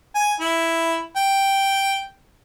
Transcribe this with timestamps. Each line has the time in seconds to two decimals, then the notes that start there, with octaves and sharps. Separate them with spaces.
0.15 G#5
0.40 E4
1.16 G5